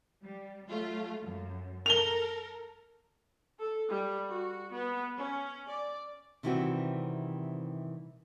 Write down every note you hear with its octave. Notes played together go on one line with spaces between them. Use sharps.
G3
F#3 A3 F4
F#2
A4 A#4 F7 G7
A4
G3
F#4
B3
C#4
D5
C3 D#3 E3 G3 C4 F#4